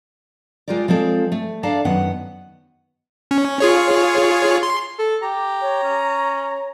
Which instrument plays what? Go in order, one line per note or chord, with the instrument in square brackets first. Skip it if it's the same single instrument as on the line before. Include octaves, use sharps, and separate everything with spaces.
[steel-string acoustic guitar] G#3 F4 G4 A#4 D5
F3 G#3 C4 A4
A3
D4 A4 D5 F5 A5 A#5
F#2 D#3 B3 F#5
[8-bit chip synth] C#4
F4 G#4 C#5
C6
[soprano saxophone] A4
[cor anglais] G4 [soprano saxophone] A#5
[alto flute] C#5
[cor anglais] C#4